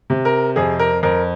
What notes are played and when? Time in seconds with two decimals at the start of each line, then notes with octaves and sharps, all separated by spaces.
0.10 C3
0.25 A#4
0.56 F2 G#4
0.79 A#4
1.03 F2 A#4